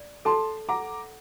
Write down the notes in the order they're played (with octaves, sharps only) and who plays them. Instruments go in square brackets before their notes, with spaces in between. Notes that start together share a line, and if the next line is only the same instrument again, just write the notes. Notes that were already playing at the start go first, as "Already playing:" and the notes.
Already playing: [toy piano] D5
[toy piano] A4 [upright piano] A5 C6
[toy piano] F#5 [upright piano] A#5 D6